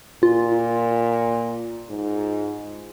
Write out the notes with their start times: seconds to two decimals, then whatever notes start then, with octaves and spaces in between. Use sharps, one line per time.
0.23 A#2 F4
1.89 G#2